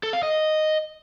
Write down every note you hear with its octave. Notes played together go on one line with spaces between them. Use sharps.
A4
F5
D#5